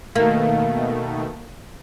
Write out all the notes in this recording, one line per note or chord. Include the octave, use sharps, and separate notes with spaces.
B2 D#3 A3 A#3